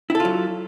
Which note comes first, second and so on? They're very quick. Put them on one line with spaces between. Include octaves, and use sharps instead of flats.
E4 A4 F4 F#3